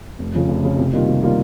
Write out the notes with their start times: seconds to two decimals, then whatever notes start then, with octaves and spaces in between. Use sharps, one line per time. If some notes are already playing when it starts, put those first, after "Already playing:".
0.19 F1
0.35 F2 C#3 F3
0.49 F1
0.64 F2 C#3 F3
0.79 C3
0.93 D#3 G3 A#3 F4
1.08 C3
1.22 D#3 G3 A#3 F4